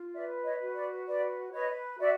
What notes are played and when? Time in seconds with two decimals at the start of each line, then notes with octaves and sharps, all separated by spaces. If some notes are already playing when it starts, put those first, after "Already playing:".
Already playing: F4
0.14 B4 D5 E5
0.44 C#5 D#5
0.60 F#4
0.75 D5
1.06 B4 D5
1.52 B4 C#5 D#5
1.99 F#4 D5 E5